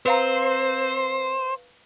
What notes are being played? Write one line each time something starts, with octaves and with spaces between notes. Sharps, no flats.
C4 B4 C5 F5 A#5